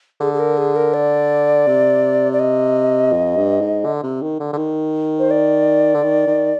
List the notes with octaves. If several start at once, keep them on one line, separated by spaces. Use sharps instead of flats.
D3 G#4
G#4
A#4
G#4
A#4
D5
C3
D5
D#5
F2
G2
G#2
D3
C3
D#3
D3
D3
D#3
C5
D5
D3
D#3
D#3